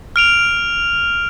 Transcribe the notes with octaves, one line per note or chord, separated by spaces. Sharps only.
F6 D7 F7